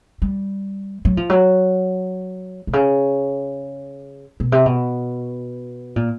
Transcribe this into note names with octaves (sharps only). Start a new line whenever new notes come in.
G3
F#3
F3
F#3
C3
C#3
B2
C3
B2
A#2